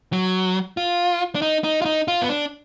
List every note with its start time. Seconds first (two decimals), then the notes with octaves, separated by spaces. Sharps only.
0.13 F#3
0.77 F4
1.35 D4
1.42 D#4
1.64 D#4
1.82 F4
1.85 D#4
2.08 F4
2.22 B3
2.29 D4